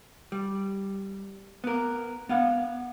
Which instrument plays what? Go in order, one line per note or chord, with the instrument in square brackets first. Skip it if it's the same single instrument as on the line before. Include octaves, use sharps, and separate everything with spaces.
[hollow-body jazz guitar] G3
B3 A#4
B3 F5 F#5